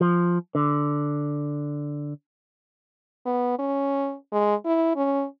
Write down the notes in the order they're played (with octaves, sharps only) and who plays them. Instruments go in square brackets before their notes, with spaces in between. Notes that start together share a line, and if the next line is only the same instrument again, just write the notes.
[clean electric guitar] F3
D3
[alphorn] B3
C#4
G#3
E4
C#4